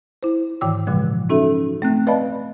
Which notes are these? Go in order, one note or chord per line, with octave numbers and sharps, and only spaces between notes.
E4 C5
G#2 D#3 E3 G5 D6 E6
A#2 C#3 F3 G#3
C#4 D#4 F#4 A4 E5
A3 C4 F#6
B4 D5 D#5 F5 A5 B5